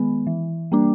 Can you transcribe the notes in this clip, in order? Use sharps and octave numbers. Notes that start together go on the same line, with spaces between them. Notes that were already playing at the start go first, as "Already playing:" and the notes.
Already playing: D#3 G#3 B3
E3
G3 A#3 D4